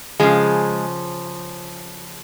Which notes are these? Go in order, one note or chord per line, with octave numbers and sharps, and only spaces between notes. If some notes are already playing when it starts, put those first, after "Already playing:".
C#3 F3 G#3